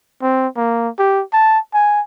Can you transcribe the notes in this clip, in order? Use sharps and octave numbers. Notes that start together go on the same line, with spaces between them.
C4
A#3
G4
A5
G#5